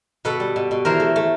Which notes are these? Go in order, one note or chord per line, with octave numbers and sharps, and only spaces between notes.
B2 A4 B4
G3
B2
B2
E3 A#4 C5
A3
A3